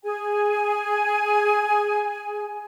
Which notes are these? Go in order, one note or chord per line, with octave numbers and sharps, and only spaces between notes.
G#4 G#5